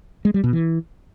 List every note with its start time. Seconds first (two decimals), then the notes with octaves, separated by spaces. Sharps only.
0.25 G#3
0.34 G3
0.44 B2
0.53 E3